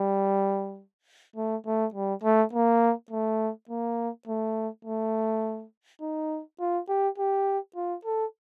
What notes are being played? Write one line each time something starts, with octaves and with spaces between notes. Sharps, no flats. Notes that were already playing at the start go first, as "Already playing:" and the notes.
Already playing: G3
A3
A3
G3
A3
A#3
A3
A#3
A3
A3
D#4
F4
G4
G4
F4
A4